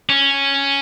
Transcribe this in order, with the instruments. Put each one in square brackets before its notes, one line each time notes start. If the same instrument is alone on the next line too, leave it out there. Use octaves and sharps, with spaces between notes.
[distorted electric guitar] C#4